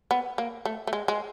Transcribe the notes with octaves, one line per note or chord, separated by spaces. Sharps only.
B3
A#3
A3
A3
G#3
G#3